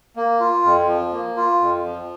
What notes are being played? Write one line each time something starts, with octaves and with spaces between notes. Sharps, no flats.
A#3
F4
F2
F3
A#3
F4
F2
F3